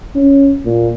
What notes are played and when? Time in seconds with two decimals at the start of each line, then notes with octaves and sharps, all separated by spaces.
0.16 C#4
0.66 A#2